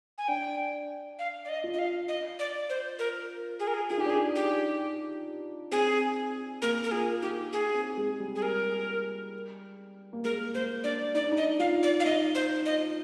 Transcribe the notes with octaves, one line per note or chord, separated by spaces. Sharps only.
G#5
D4 G5
F5
D5
D#5
F4
D#5
F5
D#5
D5
C5
A#4
G#4
A#4
G#4
F4 G#4
D#4
G4
D4
D#4 G#4
G4
C4 G#4
A#3 A#4
A#4
F4 G#4
D#4 G4
G#4
C4
G#3
G3
G#4
A#4
A#3
G#3 A#4
A#3 C5
D4 D5
D#4 D5
D4
D#4
D#5
F4 F5
D5
F5
D#4 D#5
C5
D#5